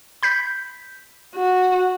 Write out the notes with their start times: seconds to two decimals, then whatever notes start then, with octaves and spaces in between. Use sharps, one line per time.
0.23 B5 G6 B6
1.36 F#4